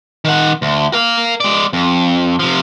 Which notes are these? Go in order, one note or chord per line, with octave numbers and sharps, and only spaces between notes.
D#3 F#5
D2
A#4 F5
G#3 D5
F2
C3 F3